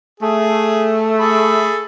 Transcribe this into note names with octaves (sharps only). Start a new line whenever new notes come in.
A3 G#4
G#4 A4 B5